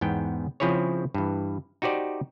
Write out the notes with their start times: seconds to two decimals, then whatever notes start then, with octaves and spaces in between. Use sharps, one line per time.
0.01 E2 G#2 B3 G5
0.60 C#3 F3 C4 E4 G#4 C#5
1.15 G2 E3
1.82 D#4 F#4 G4 C5 D5